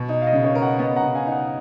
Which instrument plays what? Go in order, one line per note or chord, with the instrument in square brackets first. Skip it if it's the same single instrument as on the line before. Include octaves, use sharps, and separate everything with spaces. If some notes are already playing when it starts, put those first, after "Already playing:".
Already playing: [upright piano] B2
[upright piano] D#4 [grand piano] D#5
[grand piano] F5
D#5
[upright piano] C#3
[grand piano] C#5 F5
[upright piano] A#4
[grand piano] D#5 F#5
[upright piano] B3 [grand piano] D#5 F#5
[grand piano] F#5 A#5
[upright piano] C#3
[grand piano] F5 G#5
[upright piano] D#4
[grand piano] D#5 F#5